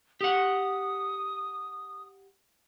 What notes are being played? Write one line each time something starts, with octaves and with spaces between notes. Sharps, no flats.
G4 F#5 D#6